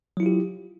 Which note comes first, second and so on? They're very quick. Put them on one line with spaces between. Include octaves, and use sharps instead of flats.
F#3 E4 F4 G4